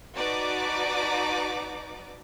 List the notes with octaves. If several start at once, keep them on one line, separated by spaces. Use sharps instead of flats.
D#4 F#4 B4 D5 A5 D6